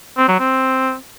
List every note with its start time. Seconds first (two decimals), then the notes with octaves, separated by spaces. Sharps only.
0.18 C4
0.29 F#3
0.40 C4